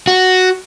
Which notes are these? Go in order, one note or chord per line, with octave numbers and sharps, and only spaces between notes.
F#4